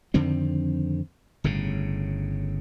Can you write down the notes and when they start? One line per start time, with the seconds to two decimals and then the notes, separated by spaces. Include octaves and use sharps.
0.14 F2 D3 D#3 C4
1.44 G1 A2 C#3